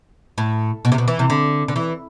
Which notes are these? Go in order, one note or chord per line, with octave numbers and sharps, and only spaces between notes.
A2
B2
C3
B2
E3
C3
D3
D3
E3